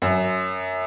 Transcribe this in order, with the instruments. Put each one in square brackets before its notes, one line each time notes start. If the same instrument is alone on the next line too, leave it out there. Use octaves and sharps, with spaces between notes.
[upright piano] F#2